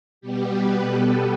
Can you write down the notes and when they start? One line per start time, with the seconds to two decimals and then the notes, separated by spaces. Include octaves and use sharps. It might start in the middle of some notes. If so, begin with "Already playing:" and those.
0.21 B2 G3 B3 G4
0.52 B4
0.84 A4